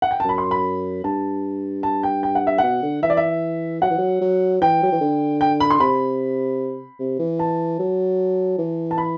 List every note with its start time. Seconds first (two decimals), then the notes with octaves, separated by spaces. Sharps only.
0.02 F#5
0.11 G5
0.20 A5
0.25 F#2 B5
0.38 C6
0.51 B5
1.04 G2 A5
1.83 A5
2.03 G5
2.23 G5
2.35 F#5
2.47 E5
2.58 B2 F#5
2.83 D3
3.03 E3 E5
3.10 D5
3.17 E5
3.82 F#3 F#5
3.90 E3
3.98 F#3
4.21 F#3
4.61 E3 G5
4.83 F#3
4.92 E3
5.01 D3
5.41 G5
5.60 B5
5.70 C6
5.80 C3 B5
7.00 C3
7.19 E3
7.39 A5
7.79 F#3
8.58 E3
8.91 A5
8.98 B5